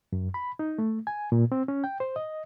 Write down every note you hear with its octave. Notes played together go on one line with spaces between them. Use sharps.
F#2
B5
D#4
A3
G#5
A#2
C4
C#4
G5
C5
D#5